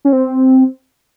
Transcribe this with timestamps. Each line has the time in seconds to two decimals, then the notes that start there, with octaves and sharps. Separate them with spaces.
0.05 C#4
0.13 C4